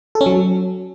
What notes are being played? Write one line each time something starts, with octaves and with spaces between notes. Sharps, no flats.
A4
C#4
F#3